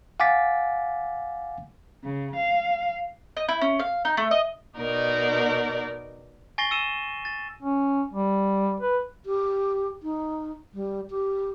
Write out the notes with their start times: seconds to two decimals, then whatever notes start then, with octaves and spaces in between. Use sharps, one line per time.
0.20 F5 F#5 G#5 D6 A6 B6
2.04 C#3
2.36 F5
3.37 D#5
3.48 E4
3.61 C#4
3.79 F5
4.05 D#4
4.17 A3
4.31 D#5
4.77 B2 D#4 A#4 D5
6.58 G#5 C#6 A6 A#6 C7 G7
6.71 E6 C#7 D#7 E7
7.25 A6
7.62 C#4
8.14 G3
8.81 B4
9.26 G4
10.03 D#4
10.74 G3
11.10 G4